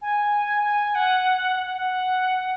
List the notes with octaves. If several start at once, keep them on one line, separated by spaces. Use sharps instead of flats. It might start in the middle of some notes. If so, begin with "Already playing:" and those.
G#5
G#5
F#5
F#5
F#5
F#5